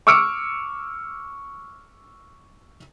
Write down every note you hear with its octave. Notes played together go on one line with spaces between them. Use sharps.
C#6 D6 E6 F6 C#7 D7